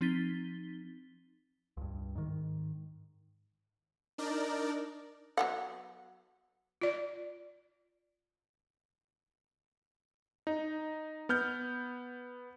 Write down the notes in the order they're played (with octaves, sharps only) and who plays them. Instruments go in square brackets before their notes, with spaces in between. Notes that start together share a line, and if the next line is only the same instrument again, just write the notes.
[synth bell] F3 C4 D#4 A6 B6 G7
[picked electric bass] C#2 G2
G#2 D#3
[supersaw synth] D4 D#4 A#4 D5
[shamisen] F#3 B3 F#5
[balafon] F4 D5
[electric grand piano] D#4
B3 F6 G6